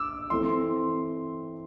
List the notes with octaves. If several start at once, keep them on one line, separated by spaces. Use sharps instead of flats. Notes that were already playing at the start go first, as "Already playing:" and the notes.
Already playing: D6 E6
E3 A3 C4 C6